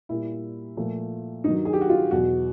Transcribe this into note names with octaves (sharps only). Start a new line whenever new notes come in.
A#2 G3 E4
A#2 F3 A3
G2 D#3 F#3 D#4
G#4
G4
F#4
F4
E2 B2 F#3 F#4